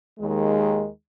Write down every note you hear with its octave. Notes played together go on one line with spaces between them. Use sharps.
D#2 D#3 G#3